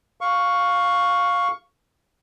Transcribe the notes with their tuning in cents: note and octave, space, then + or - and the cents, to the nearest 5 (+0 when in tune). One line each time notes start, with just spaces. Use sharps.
F5 +10 C#6 +0